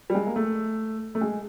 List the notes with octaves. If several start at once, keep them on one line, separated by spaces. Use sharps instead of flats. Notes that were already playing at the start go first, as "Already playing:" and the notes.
G3
G#3
A#3
A3
A3
G#3